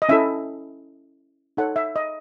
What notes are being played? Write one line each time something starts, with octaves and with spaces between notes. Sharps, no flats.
D#5
C#4 E4 A4 E5
D#4 A4 C#5 F#5
E5
D#5